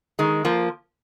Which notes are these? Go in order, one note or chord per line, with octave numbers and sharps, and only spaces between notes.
D#3 G#3
F3 A#3